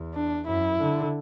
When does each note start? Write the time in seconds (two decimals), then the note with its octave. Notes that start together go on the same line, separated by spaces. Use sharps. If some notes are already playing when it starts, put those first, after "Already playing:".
Already playing: E2
0.14 D4
0.47 F#2 E4
0.79 D3